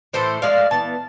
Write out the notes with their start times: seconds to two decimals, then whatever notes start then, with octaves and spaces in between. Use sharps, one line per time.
0.13 A2 E3 A3 A4 C5
0.42 F3 G#3 D4 D5 F5
0.71 E3 B3 A5